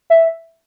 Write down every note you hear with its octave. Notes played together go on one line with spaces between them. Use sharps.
E5